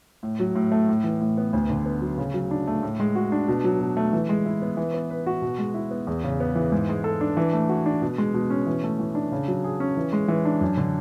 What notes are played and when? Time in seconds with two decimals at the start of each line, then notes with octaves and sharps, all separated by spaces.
0.23 A2
0.40 F#3
0.55 A2
0.72 A3
0.89 A2
1.04 E3
1.21 A2
1.37 B3
1.53 D2
1.70 D3
1.86 B3
2.01 F#3
2.18 C#3
2.34 F#3
2.51 D4
2.67 A3
2.83 A2
3.00 G#3
3.15 F#4
3.32 D4
3.48 B2
3.64 F#3
3.80 B2
3.97 A3
4.13 E3
4.29 G#3
4.46 E4
4.62 B3
4.77 E3
4.94 B3
5.10 B4
5.27 F#4
5.42 B2
5.58 G#3
5.74 E4
5.91 B3
6.07 E2
6.24 C#3
6.40 B3
6.55 E3
6.72 G#2
6.89 G#3
7.04 A4
7.21 D4
7.37 E3
7.53 A3
7.69 F#4
7.86 D4
8.02 B2
8.18 G#3
8.34 B2
8.50 C#4
8.66 E3
8.83 A3
9.00 E3
9.15 D4
9.32 C#3
9.48 F#3
9.64 G#4
9.80 C#4
9.97 E3
10.13 G#3
10.28 E3
10.45 D4
10.61 F#2
10.77 D3